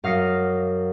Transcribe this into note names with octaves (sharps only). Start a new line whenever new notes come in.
F#2 F5 D#6 A#6 C#7